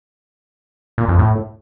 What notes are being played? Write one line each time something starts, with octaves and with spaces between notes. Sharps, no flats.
A#2
F2
A2